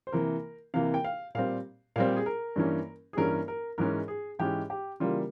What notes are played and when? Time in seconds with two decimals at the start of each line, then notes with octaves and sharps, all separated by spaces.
0.07 C5
0.12 C3 E3 A#3 A#4
0.74 C3 E3 A#3 F5
0.94 G5
1.04 F5
1.35 A#2 G3 C4 F5
1.96 A#2 G3 C4 F5
2.16 G#4
2.26 A#4
2.56 G2 E3 A#3 C#4
3.13 G#4
3.17 G2 E3 A#3 C#4 A#4
3.48 A#4
3.78 G#2 E3 G#3 C#4 A#4
4.08 G#4
4.39 G#2 E3 G#3 C#4 G4
4.70 G4
5.00 C#3 E3 G3 A#3 F4